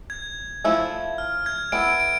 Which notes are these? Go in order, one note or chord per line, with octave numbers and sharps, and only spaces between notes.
G#6
F3 A3 E4
F6
G#6
B3 E4 A4 D7
D7